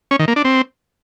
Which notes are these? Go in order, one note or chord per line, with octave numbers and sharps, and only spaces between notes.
C#4
D#3
A#3
D4
C4